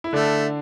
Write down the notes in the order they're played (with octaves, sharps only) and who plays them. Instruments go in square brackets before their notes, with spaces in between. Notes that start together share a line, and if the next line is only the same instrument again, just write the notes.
[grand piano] E4
[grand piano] D3 D4 [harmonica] A3